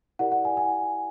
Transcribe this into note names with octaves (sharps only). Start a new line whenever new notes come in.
E4 G4 A#4 D5 F#5
F#5
G#5
G#5